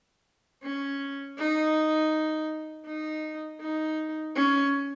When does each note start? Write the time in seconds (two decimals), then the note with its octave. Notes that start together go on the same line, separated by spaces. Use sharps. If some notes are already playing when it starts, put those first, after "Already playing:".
0.63 C#4
1.38 D#4
2.86 D#4
3.61 D#4
4.35 C#4